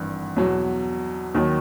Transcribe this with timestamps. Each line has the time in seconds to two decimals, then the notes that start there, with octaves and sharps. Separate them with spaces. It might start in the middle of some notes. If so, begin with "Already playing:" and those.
Already playing: G#1 G2 E3
0.36 E2 B2 F#3
1.34 D#2 D#3 F#3